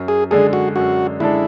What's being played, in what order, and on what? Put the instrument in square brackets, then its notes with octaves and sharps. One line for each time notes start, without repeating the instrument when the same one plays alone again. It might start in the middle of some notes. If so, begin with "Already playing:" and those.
Already playing: [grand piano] F#2
[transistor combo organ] G#4
[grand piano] D3 G#3 D4 A4 [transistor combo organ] G#4
[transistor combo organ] F#4
[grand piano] F#2 [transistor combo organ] F#4
[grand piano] D3 G#3 D4 A4 [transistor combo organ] E4